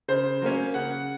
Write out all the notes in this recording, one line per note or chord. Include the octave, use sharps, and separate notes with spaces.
C#3 C5
F#3 A#3 C#4
C#3 F#5